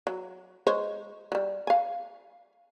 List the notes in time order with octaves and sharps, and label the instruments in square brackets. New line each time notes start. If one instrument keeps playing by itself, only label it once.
[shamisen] F#3
G#3 C5 C#5
F#3 G3
F5 G#5